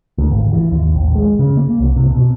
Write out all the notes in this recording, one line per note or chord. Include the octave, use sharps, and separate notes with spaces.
D2
G#1
E3
D#2
A#1
G#3
C#3
A#3
C2
C3
B2